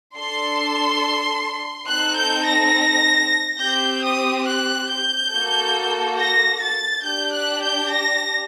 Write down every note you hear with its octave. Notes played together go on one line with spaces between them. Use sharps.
D4 A4 C6
C4 D#4 A4 F#6
G6
A#6
C4 G4 G6
D#6
F#6
G6
A#3 F#4 A4
A#6
A6
D4 G4 G6
F#6
G6
A#6